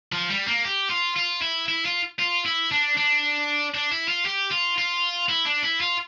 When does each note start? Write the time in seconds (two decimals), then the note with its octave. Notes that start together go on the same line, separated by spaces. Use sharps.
0.13 F3
0.30 G3
0.47 A#3
0.65 G4
0.90 F4
1.17 F4
1.42 E4
1.68 E4
1.85 F4
2.19 F4
2.45 E4
2.71 D4
2.97 D4
3.75 D4
3.92 E4
4.09 F4
4.26 G4
4.52 F4
4.78 F4
5.29 E4
5.47 D4
5.64 E4
5.81 F4